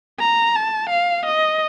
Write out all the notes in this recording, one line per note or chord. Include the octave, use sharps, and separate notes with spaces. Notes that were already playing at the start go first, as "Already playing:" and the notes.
A#5
A5
F5
D#5